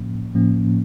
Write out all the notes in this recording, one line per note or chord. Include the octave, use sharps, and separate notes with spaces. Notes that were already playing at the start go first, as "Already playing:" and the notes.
Already playing: A2 F3 A#3 C#4
A2 F3 A#3 C#4